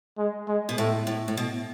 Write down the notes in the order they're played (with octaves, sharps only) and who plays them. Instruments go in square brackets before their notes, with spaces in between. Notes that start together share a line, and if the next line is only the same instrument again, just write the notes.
[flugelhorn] G#3
G#3
[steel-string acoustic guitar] B2
[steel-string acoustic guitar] A2 [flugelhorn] A3
[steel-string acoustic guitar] A2
A2
B2